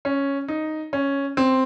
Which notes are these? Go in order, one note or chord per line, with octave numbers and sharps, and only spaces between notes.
C#4
D#4
C#4
C4